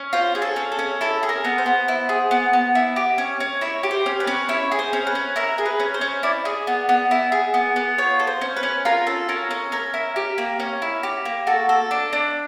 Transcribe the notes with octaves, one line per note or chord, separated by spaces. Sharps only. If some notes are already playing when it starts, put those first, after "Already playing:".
Already playing: C#4
F4 C5
G#4
A4
C#4
A4
C#4
E4 A4
G#4
A#4
B3
C5
B3
E4
G#4
B3
B3
E4
G4
C#4
C#4
E4 C#5
G4
C5
C#4
B4
C#4
E4 C#5
G#4
C5
C#4
B4
C#4
E4 A#4
G#4
B4
C#4
C5
C#4
E4 D5
G#4
B3
B3
E4
G#4
B3
B3
F4 C#5
A4
C5
C#4
B4
C#4
F4 A#4
A4
C#4 A#4
C#4
C#4 A#4
E4
G4
A#3
C#4
E4
G4
A#3
F#4 A4
A4
D4
D4